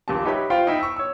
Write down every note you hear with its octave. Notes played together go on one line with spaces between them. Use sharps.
D#1 A#1 A#2 G4 A5
D#4 G4 B4 C#5 E5 B5
F4 C5 F5 G5
D#4 E4 G5
C#6 E6
C#5 E6